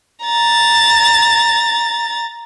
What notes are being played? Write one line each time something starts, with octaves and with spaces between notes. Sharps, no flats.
A#5 A6